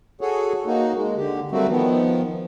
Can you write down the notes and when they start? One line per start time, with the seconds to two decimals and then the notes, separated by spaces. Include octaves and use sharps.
0.21 F#4 G#4 A4 C#5
0.66 A#3 D#4 F#4
0.95 G#3
1.17 D3 G4
1.51 F#3 G3 A3 A#3 C4 F#4
1.69 D#3 F3 B3